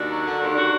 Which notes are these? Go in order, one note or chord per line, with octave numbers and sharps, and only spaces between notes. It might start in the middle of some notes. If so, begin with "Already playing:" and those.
Already playing: D#2 D4 F#4
F#3
D3
D#2
D4 F#4